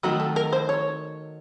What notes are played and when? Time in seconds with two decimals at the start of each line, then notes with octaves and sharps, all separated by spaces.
0.03 D#3 F#3 A3 D#4 F#4
0.20 A4
0.36 A#4
0.53 C5
0.69 C#5